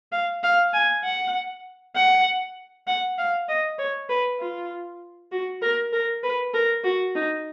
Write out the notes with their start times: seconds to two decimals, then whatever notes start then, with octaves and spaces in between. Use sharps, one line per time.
0.12 F5
0.44 F5
0.73 G#5
1.04 F#5
1.96 F#5
2.87 F#5
3.18 F5
3.49 D#5
3.78 C#5
4.09 B4
4.40 F4
5.32 F#4
5.62 A#4
5.93 A#4
6.23 B4
6.54 A#4
6.84 F#4
7.15 D#4